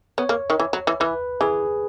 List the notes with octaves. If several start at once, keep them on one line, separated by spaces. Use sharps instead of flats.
B3 C#5
A#3
D#3
E3
F#3
E3
E3 B4
E3 G#4